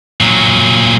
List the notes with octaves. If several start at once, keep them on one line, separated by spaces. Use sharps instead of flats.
A#2 F#3